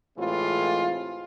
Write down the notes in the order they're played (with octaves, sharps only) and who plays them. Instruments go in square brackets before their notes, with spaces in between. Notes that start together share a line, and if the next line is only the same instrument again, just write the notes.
[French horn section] A2 C3 E3 G#3 F4